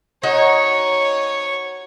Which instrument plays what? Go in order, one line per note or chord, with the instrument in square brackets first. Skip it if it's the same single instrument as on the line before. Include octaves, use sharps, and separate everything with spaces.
[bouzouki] D#4 F#4 F#5 [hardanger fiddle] C#5